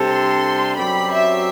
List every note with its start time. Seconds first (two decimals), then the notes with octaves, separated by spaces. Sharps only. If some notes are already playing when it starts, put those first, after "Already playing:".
Already playing: C3 G3 D4 A4 C5
0.09 C6
0.76 F#2 F#3 C4 G4 D5 B5
1.11 E5